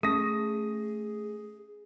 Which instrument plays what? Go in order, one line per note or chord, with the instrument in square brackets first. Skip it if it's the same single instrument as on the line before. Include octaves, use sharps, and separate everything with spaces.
[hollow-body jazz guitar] A3 [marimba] C#4 [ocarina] G#4 [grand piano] D#6 A#6